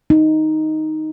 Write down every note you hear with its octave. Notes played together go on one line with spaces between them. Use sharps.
D#4